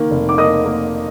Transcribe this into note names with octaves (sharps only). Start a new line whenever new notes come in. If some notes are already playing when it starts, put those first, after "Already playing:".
Already playing: D#3 A#3
F1
D6
A#3 D#5 D#6
A#3